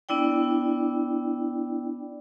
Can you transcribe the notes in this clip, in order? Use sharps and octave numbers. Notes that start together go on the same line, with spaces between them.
B3 D4 E4 D5 G5